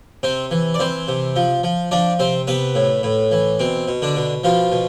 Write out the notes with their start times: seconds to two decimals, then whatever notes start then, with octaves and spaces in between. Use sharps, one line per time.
0.23 C3 C4 C5
0.51 E3
0.74 D5
0.79 E3 C4 C5
1.08 C3
1.36 F3
1.63 F3
1.91 F3 D4 D5
2.19 C3 C4 C5
2.47 C3 B3 B4
2.75 A2
3.03 A2
3.31 E3
3.60 B2 C4
3.88 B2
4.02 D3 D4
4.17 B2
4.44 B2 F3 F4
4.72 B2